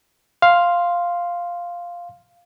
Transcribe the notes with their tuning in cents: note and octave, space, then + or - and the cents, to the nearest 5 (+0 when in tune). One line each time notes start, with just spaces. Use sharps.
F5 +0 C6 +0